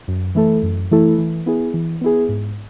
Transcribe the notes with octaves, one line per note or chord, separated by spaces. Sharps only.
F#2
E3 A3 E4 A4
F#2
E3 A3 E4 A4
E3
B3 E4 G#4
E3
B3 E4 G#4
G#2